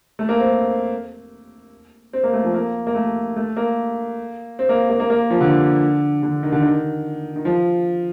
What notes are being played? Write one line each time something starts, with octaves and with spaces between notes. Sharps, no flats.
A3
A#3
C4
C4
A#3
A3
F3
A#3
A#3
A3
A3
A#3
C4
A#3
A#3
A#3
A#3
F3
D3
D3
D#3
D3
D#3
D#3
F3